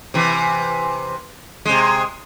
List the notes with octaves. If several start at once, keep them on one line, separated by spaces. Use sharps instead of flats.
C3 E3
C3 G#3